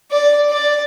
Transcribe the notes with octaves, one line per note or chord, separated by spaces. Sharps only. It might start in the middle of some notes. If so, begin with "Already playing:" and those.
D5
D5